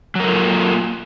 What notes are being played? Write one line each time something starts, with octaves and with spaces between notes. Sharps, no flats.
F#3 A#3 F4 A4 A#4